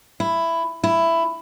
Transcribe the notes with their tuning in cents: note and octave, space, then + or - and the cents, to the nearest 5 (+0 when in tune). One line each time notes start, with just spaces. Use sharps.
E4 +10
E4 +10